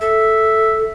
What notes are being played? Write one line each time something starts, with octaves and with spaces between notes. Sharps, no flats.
A4 E5